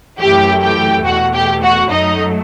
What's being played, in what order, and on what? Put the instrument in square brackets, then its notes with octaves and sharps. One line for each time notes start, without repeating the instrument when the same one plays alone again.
[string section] F#2 E3 A3 G4 G5
G4 G5
E2 B2 A3 F#4 F#5
G4 G5
F#4 F#5
F#2 F#3 A3 D#4 D#5